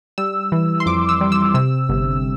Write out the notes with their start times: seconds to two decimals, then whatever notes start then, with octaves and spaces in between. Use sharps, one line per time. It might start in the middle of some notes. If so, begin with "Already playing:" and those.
0.18 G3 E6
0.52 E3
0.80 C6
0.86 F2 D6
1.09 E6
1.21 G3
1.32 E6
1.54 C3 E6
1.89 G1